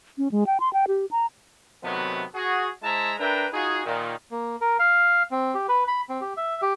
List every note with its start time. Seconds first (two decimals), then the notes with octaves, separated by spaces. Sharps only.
0.18 C#4
0.32 G#3
0.47 G5
0.60 C6
0.73 G5
0.88 G4
1.11 A#5
1.83 C3 D#3 F#3 A3 B3
2.34 F#4 G#4
2.83 G#3 E4 C5 E5 A5 A#5
3.19 D4 A#4 B4 E5 G5 A#5
3.52 D#4 F4 F#4 G#4
3.85 A#2 D#3
4.31 A#3
4.61 A#4
4.79 F5
5.31 C4
5.54 G4
5.69 B4
5.88 B5
6.09 C4
6.21 G4
6.37 E5
6.62 G4